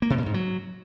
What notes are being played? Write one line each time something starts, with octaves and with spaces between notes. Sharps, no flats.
A#3
C3
B2
G#2
F#3